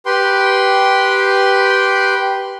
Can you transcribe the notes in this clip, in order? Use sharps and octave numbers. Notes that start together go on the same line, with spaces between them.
G4 B4 G5 C6